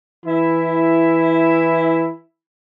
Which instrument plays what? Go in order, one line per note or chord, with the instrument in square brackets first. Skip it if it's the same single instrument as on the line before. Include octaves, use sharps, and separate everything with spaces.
[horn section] E3 E4